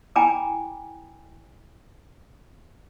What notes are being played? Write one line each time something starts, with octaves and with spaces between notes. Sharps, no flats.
E4 G5 G#5 A#5 B5 D6